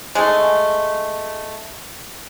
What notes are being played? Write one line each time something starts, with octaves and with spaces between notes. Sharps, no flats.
G#3 A3